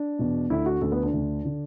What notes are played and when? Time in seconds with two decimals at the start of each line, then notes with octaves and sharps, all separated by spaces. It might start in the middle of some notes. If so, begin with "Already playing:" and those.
Already playing: D4
0.19 E2 B2
0.50 D2 D3 E4
0.66 F#4
0.81 D2 D3 A4
0.92 B3
1.03 D4
1.13 D2 D3
1.45 D3